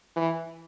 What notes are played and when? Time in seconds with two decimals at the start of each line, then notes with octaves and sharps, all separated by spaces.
0.16 E3